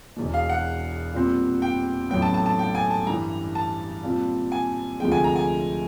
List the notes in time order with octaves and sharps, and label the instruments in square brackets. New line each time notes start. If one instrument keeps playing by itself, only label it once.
[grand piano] E1 E2 B2
[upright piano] F5
F#5
[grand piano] A#2 G3 C4
[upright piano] G5
[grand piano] A1 A2 F#3 B3 [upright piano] G5
[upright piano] A5
A5
A5
G5
G#5
A5
[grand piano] G2 E3 G3 [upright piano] A#5
[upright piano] A5
[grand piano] A#2 G3 C4 F4
[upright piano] G#5
[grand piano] D2 C3 F3 G#3 [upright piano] G5
[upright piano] G#5
A#5
G#5